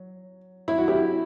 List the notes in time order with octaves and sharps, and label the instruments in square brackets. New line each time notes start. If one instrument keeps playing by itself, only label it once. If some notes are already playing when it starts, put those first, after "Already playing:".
Already playing: [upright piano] F#3
E4
F#4
E4 G4